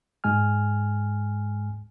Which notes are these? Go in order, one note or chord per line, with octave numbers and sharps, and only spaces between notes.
G#2 G#3 G#5 F6